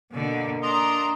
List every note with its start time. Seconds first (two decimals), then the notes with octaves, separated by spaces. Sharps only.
0.12 B2 D3 A#3
0.63 D4 D#5 A#5 C6